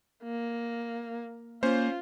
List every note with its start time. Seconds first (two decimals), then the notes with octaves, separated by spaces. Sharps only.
0.24 A#3
1.63 A#3 C#4 F4 C5